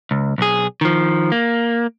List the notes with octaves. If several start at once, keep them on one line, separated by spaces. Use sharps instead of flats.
C#2
B1 G#4
D#3 F3
A#3